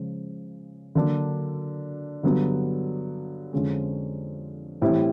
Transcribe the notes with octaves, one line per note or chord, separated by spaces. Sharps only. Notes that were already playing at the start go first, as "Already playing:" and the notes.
Already playing: C#3 F3 G#3
D3 F#3 A#3 D4
G2 D3 F#3 B3
F2 D3 F3 G#3 C#4
A2 E3 G3 C4 E4